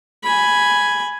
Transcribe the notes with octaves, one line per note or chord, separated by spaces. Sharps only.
G#5 B5